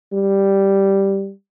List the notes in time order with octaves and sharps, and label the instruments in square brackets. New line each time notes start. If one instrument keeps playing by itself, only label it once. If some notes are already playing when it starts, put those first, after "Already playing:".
[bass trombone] G3